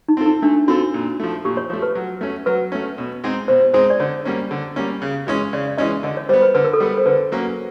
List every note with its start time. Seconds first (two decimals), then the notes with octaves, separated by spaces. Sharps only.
0.08 D#4
0.17 C4 F4 A4
0.26 D#4
0.42 A3 D4
0.68 C4 F4 F#4 A4
0.94 A#2
1.20 F3 A3
1.45 A#2 G4
1.57 C#5
1.70 F3 A3 C#5
1.82 B4
1.95 F#3
2.21 A3 C#4
2.46 F#3 B4
2.72 A3 C#4
2.98 B2
3.24 G#3 C4 D#4 G#4
3.48 B2 C5
3.74 G#3 C4 D#4 G#4 C5
3.90 D5
4.00 D3 C#5
4.25 G3 A#3 C#4
4.51 D3
4.76 G3 A#3 C#4
5.02 C#3
5.27 E3 G#3 C#4
5.53 C#3 D5
5.67 D5
5.78 E3 G#3 C#4 D#5
6.03 D3 D#5
6.17 C#5
6.29 G3 B3 C5
6.42 B4
6.55 D3 B4
6.64 A#4
6.73 A4
6.80 G3 B3 A#4
6.98 C5
7.06 D3 B4
7.32 F#3 A#3 C#4